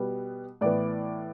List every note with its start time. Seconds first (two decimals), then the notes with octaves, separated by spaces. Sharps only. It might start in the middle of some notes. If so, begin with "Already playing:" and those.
Already playing: B2 G3 B3
0.61 A2 E3 B3 D5